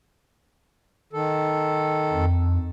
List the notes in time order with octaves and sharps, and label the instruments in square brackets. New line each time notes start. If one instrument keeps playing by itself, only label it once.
[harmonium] D#3 A4
[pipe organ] F2